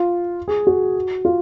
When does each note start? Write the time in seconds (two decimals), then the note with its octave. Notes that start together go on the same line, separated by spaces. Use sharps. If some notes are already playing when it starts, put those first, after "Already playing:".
Already playing: F4
0.48 G#4
0.67 F#4
1.25 F4